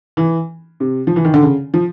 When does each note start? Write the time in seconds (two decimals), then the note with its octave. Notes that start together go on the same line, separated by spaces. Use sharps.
0.17 E3
0.80 C3
1.07 F3
1.16 E3
1.25 D#3
1.34 D3
1.43 C#3
1.74 F3